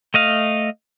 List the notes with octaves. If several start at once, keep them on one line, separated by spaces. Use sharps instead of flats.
A3 D#5 F5